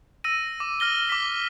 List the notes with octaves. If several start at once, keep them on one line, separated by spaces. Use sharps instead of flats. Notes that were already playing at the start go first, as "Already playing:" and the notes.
E6 A#6 D#7
D6
E6 F6 A#6 G7
D6 B6